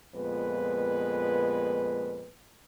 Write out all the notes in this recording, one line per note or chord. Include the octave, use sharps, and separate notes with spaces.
F2 A#2 G#3 B3 B4